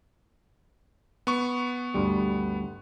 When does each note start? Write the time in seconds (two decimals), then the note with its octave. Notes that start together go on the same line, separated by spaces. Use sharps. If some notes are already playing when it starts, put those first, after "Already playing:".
1.27 B3 C#6
1.94 G1 D2 G3